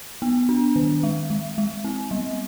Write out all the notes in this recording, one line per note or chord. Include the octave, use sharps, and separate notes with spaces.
B3
D4
D#3
G#3
G#3
G#3
C4
G3